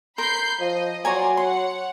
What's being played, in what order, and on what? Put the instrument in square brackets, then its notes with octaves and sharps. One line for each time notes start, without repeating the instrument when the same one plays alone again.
[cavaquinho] A#4 C6 [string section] B5 G6 C7
[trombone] F3 [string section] D#5
[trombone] F#3 [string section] D5 C6 [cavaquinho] G#5 A#5 C#6
[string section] C#5 F#5 [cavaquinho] C6